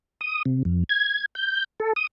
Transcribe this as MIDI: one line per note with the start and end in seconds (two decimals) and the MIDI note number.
0.21 0.43 87
0.45 0.63 48
0.65 0.83 41
0.89 1.25 92
1.35 1.64 91
1.80 1.93 69
1.96 2.07 87